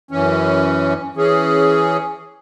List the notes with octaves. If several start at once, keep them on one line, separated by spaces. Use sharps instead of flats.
F#2 E3 C#4
E3 C#4 G#4